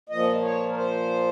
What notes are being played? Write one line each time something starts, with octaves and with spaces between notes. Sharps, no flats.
A#2 F3 D#5
C#5
A#4
C5